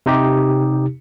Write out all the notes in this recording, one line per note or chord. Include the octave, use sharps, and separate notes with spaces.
C3 D#4 G4